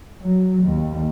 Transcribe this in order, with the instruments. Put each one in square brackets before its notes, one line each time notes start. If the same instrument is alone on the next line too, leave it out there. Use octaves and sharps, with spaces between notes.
[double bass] F#3
D#2